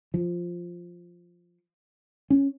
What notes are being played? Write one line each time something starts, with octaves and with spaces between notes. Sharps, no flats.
F3
C#4